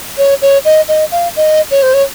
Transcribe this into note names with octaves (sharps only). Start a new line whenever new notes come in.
C#5
C#5
D#5
D#5
F5
D#5
C#5
C5
C#5